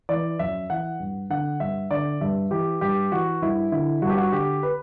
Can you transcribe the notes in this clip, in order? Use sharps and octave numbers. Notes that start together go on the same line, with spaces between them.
E3 D5
F#2 E5
E3 F#5
G2
D3 F#5
G2 E5
D3 D5
G2 E5
E3 G4
G2 G4
E3 F#4
G2 E4
D3 E4
G2 F#4
G4
F#4
D3 G4
B4